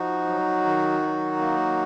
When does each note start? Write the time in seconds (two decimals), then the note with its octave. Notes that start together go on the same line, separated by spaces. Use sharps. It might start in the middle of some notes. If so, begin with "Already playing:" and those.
Already playing: F3 D#4 F#4
0.28 F#3
0.65 D#3
1.02 F#3
1.39 A#3